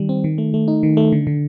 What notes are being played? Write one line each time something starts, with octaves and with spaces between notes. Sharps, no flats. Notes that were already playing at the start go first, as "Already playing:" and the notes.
Already playing: D#3 G3
C4
D#3
A3
A3
D#4
D#3
A3
D3
D3